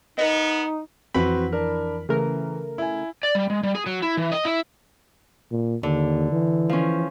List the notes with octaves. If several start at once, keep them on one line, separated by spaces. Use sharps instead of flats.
B3 D#4 A#4 D#5
F2 E3 C4 F#4 B4 B5
D4 A#4
C#3 E3 A3 A#4
E4 G#5
D5
G3
G#3
G3
G#4
F#3
E4
E3
D#5
E4
A#2
D#2 D3
E3
F3 C#4